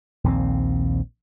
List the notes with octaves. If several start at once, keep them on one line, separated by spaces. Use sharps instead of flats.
A#1 D#2 E3 C4